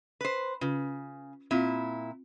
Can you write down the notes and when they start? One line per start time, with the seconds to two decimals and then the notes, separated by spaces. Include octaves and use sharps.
0.21 B4 C5
0.61 C#3 C#4 F4 B4
1.51 A#2 C4 E4 F4 F5